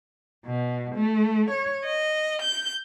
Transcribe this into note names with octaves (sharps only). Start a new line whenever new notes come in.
B2
A3
C#5
D#5
G6